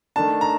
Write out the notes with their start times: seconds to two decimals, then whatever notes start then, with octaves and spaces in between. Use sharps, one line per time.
0.16 D#3 A3 D4 A5
0.41 A#5